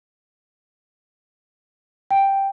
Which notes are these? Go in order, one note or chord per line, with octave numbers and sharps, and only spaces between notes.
G5